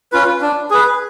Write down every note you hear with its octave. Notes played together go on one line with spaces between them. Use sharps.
C#4 F4 B4
D4
G#4 B4